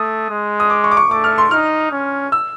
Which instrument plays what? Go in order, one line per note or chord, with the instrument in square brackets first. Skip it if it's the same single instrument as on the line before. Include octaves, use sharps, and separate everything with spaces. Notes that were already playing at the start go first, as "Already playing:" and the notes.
Already playing: [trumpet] A3 [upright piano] D#6
[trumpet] G#3
[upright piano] D#6
D6
C#6
D6
C#6
[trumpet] A3 [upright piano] D6
[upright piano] F6
C6
[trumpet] D#4 [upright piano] F6
[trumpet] C#4
[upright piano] E6